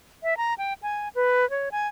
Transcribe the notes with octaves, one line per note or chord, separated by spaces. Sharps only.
E5
A#5
G5
G#5
B4
C#5
G#5